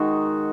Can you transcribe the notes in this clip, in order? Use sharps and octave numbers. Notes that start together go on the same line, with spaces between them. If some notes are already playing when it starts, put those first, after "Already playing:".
Already playing: D#3 G#3 D#4 F#4